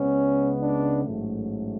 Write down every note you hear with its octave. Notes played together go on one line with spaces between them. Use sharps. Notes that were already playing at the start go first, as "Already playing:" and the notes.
Already playing: C#2 C#3 G#3 B3 C#4
D4
A1 G#2 F#3 A3